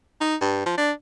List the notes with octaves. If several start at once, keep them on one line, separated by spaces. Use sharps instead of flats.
D#4
G2
F3
D4